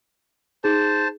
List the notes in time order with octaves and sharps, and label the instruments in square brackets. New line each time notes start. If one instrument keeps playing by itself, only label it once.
[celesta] D#4 G#4 [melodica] C5 A5